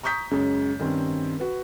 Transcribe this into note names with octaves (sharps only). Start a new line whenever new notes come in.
A#5 C#6 D#6 G6 B6
F#2 C#3 G#3
G2 D#3 C4 C#4
F#4 B4